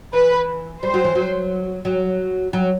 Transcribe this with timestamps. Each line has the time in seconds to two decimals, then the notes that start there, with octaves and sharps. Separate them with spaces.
0.13 E3 B4
0.83 G3 C5
0.94 F#3
1.04 E3
1.15 F#3
1.85 F#3
2.53 F#3